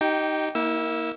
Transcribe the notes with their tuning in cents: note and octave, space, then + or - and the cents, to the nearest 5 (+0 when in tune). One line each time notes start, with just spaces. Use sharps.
D#4 +0 G4 -25 G5 +0
A#3 +0 E4 -40 E6 +0